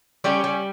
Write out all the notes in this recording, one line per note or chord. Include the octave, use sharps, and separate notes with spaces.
G3 C#4 G4
G3